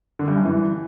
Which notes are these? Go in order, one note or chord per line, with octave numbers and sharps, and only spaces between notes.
D3
G2
F#2
E3